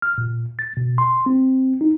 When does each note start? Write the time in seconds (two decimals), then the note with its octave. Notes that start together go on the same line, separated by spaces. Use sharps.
0.02 F6
0.18 A#2
0.59 A6
0.77 B2
0.98 C6
1.26 C4
1.81 D#4